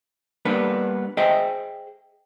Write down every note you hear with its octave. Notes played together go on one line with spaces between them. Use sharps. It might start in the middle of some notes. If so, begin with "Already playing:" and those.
G3 A#3 B3 D4 B4
G#4 C5 D#5 E5 G5